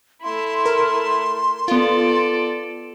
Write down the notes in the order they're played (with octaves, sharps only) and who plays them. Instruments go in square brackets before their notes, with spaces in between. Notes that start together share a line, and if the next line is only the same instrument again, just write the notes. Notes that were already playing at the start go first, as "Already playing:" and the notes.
[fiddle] A3 E4 [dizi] C6
[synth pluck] A#4
[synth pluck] B3 F4 [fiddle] A4 D5